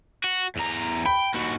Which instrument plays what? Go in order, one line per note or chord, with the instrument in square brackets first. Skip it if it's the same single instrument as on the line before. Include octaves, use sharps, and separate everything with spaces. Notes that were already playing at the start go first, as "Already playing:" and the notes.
[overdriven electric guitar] F#4
E2 A#5
[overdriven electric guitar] G5 [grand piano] B5
[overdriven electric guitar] D#2 F#4